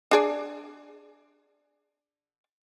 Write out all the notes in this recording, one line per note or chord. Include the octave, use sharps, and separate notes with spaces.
D4 G#4 D5